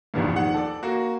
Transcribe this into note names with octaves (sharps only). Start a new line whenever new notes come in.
F1 A#1 E2 G2
A#1 D#3 F#5
A4 D5
A#3 F#4